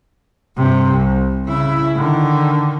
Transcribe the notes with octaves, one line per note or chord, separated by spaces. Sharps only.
G2 C3
C2
C#3 E4
D3 D#3